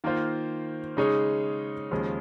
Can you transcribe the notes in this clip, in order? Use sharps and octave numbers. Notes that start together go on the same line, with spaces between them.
D#3 A#3 F4 C5
C#3 G#3 D#4 G#4 C#5
D#2 C#3 F3 G#3